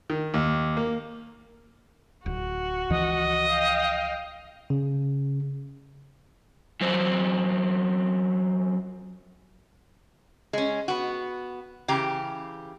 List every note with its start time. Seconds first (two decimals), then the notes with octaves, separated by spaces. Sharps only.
0.10 D#3
0.34 D#2
0.77 A#3
2.26 D1 F#4
2.90 C#2 E3 F3 D#5
3.49 F5 G5
4.70 C#3
6.81 F#2 C4
10.53 G#3 C#4
10.88 B3 F#4
11.88 C#3 E3 G4 A#5